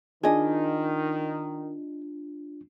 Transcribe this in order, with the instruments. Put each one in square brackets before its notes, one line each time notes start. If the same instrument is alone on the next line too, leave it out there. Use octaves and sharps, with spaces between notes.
[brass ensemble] D#3 [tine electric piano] D4 F4 [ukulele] G#4 D#5